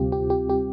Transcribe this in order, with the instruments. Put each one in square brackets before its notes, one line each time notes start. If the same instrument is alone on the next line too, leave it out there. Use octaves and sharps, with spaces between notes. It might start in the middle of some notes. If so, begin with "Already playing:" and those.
Already playing: [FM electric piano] D2 C3 G3 C4 F4 G4
G4
G4
G4